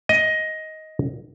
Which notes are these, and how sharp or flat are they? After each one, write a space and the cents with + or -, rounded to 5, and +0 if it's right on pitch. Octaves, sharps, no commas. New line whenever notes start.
D#5 +10